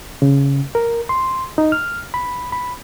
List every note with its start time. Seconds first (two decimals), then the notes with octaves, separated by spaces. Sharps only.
0.22 C#3
0.75 A#4
1.09 C6
1.58 D#4
1.72 F6
2.14 B5
2.52 B5